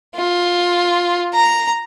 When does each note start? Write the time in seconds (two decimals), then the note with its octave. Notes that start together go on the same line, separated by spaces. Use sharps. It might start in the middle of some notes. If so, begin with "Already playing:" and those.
0.16 F4
1.34 A#5